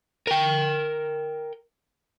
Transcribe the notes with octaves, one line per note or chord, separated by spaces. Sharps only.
A#4 G5